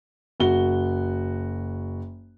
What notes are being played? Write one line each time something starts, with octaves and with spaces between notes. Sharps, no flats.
F#1 F#4 G7